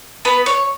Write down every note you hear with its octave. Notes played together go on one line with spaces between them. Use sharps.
B3 B4
C#5